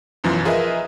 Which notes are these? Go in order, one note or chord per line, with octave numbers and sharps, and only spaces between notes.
B1 F#2 E3 F3
F4 G#4 A#4 B4 D#5 E5